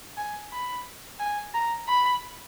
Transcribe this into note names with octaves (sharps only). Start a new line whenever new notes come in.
G#5
B5
G#5
A#5
B5